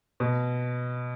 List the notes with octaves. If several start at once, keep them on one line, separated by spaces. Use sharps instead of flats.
B2